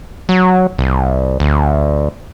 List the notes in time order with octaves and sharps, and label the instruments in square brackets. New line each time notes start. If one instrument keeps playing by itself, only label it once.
[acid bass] F#3
C2
D2